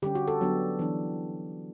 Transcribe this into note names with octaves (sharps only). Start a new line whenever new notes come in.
D3 G3 C#4 G4
F#4
A4
F#3 B3 D4
E3 B3 D4